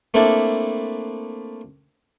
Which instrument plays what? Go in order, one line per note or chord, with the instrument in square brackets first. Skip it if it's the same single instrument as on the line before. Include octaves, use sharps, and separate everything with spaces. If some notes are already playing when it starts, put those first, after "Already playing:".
[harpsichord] A3 A#3 C4 D4 E4 A4